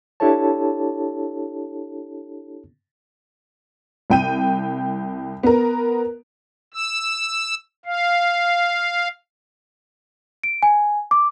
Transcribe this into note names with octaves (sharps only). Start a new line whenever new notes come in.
D4 E4 G4 A4 C#5 A5
C2 G5 D#7
B3 A#4
E6
F5
D7
G#5
D6